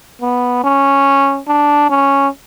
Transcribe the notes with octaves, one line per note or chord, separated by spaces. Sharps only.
B3
C#4
D4
C#4